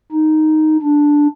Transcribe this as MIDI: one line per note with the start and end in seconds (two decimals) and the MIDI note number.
0.12 0.77 63
0.82 1.28 62